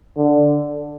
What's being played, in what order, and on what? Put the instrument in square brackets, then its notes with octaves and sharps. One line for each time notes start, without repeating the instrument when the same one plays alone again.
[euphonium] D3